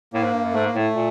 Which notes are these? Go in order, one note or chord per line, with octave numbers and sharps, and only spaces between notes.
A2 A#3
G#2
G2
F#2
G#2 A3
A#3
A2 A3
A#2